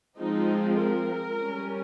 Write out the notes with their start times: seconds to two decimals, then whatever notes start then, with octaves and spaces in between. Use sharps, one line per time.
0.19 F3 G#3 C4 D#4
0.80 A#4
1.39 G3 C#4